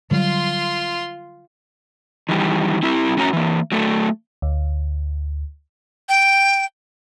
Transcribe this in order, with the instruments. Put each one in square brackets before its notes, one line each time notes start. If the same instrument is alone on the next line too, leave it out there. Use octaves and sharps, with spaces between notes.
[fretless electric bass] D3 F#3 G3 [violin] F4 C6
[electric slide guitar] D#3 E3 G3
C4 E4 G4
A2 C#4 F#4 C#5 A5 A#5
E3 A#3
F#3 A3 A4
[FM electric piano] D2
[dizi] G5